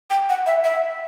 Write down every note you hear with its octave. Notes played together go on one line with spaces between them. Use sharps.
G5
F#5
E5
E5